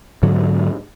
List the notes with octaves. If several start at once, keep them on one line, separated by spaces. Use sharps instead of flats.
G#2 D3 F#3